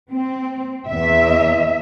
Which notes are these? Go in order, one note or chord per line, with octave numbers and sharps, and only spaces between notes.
C4
E2 E5